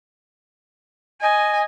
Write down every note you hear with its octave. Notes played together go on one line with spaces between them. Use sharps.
D#5 G#5